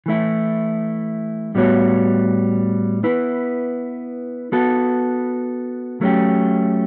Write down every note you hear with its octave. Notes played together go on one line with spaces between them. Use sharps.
E3 A3 E4
A2 G3 B3 F#4 C#5
B3 E4 B4
B3 F#4 A4
F#3 A3 C#4 G4